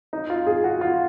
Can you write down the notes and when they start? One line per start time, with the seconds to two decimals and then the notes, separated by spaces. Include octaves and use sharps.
0.13 D#4
0.30 F4
0.47 G#4
0.64 F#4
0.81 F4